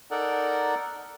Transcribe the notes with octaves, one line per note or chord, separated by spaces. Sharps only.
D#4 A4 A#4 D5 F#5